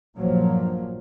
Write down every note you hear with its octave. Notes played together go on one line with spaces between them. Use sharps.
A#1 G2 F3 F#3 A#3